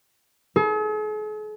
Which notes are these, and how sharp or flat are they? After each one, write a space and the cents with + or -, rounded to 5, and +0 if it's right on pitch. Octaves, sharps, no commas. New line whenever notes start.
G#4 +45